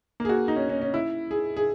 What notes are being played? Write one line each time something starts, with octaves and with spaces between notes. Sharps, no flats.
A#3
G#4
F#4
D#4
C#4
C#4
C#4
E4
G#4
G#4